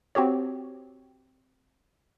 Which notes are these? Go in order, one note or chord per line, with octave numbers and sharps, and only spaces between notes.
C4 F#4 G4 C#5